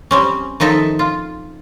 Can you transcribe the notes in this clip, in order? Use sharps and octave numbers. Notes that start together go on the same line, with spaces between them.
G3 C4 C#4
D#3 F3 D#4 A4 E5
F4